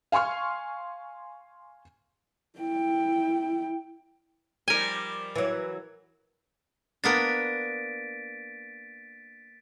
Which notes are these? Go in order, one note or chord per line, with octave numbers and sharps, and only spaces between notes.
F5 G#5 C6 C#6 F6
E4 G5
F3 G3 D#4 A#4 G#5
E3 F#3
A#3 B3 D4 A6 B6 D7